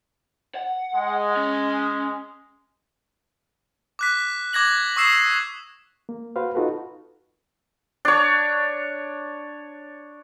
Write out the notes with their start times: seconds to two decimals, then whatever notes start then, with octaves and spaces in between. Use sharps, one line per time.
0.55 F#5
0.95 G#3
1.36 C#4
3.99 D6 F#6 B6
4.53 D6 G#6 A#6 F#7
4.96 C#6 D#6 E6 C7 E7
6.09 A#3
6.36 F#4 B4 C5 F5
6.55 D#4 F4 F#4 A4 B4
8.05 D4 C#5